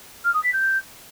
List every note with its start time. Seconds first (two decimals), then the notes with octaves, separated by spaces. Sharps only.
0.25 F6
0.34 D#6
0.44 B6
0.53 G6